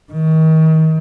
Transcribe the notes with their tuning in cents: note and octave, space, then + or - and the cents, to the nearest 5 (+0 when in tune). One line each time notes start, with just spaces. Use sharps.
D#3 +35